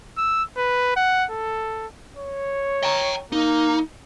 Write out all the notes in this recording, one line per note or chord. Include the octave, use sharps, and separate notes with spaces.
E6
B4
F#5
A4
C#5
G5 A#5
A#3 D#4